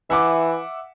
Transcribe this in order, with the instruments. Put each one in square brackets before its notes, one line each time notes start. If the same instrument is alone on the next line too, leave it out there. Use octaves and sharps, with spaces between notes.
[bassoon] E3 [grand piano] E5 F#5 D6